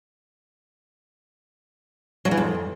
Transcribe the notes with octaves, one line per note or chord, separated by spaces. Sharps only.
F#3
E3
F2